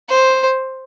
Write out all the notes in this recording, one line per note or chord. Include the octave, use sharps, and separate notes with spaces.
C5